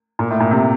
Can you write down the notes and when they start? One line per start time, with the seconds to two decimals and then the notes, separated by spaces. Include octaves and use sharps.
0.19 A#2
0.30 A2
0.40 A#2
0.51 C3